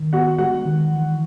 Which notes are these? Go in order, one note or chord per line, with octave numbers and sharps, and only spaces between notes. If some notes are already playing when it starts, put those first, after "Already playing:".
Already playing: D#3
B3 F#4 F#5
G#3 F#4 F#5
D#3
E3